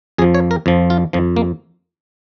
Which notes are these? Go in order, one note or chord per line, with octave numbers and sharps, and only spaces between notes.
F2 F3 G#4
C#5
A#4
F2 F3
F4
F2 F3
A#3